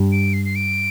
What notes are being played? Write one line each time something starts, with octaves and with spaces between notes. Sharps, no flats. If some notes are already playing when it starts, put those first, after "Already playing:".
Already playing: G2
D7
C7
C7
D7